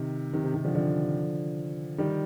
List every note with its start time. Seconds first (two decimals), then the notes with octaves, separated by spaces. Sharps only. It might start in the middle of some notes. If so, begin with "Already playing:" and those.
Already playing: C3 D#3
0.33 C3 D#3
0.44 C3
0.54 C3 D#3
0.65 D3 F3
0.75 D3 F3
1.98 D#3 G3